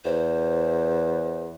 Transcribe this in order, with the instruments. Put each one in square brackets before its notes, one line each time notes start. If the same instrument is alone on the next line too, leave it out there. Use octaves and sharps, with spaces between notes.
[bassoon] E2 [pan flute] C5